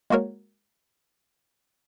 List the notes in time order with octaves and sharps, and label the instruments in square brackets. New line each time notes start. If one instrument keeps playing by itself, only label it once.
[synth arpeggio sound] G#3 A#3 F#4 A#4 C#5